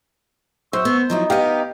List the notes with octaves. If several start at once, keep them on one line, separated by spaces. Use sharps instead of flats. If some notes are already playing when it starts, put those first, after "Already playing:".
F#2 C5 C#6 E6
B3
F3 F#3 D#4 E4
B3 G4 D#5 F5